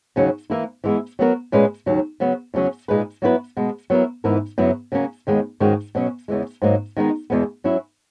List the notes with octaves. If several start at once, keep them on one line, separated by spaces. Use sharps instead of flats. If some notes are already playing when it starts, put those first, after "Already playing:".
D#2 C#3 F#3 C#4
E3 A#3 E4
E3 G#3 B3 E4
F#3 B3 F#4 A#4
A#2 G#3 C#4 G#4 B4
D#2 C#3 F#3
C#3 F#3 B3
E2 C#3 F#3 C#4
A#2 G#3 D#4 G#4 B4
F#3 B3 E4 B4
B2 G#3 B3
F#3 B3 E4 A#4
G#2 E3 B3 E4 A#4
F#2 C#3 F#3 B3 E4
C#3 F#3 A#3 C#4
D#2 D#3 G#3 B3
G#2 D#3 G#3 C#4 F#4
B2 F#3 C#4
E2 C#3 E3 G#3
G#2 F#3 A#3 D#4
D#3 G#3 B3 D#4
E2 B2 G#3 B3
F#3 C#4 E4